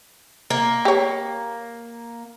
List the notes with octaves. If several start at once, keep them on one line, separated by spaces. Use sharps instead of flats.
A#3
G4 C#5